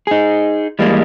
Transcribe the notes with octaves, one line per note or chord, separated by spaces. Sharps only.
D#4 G#4
E3 G3 G#3 A#3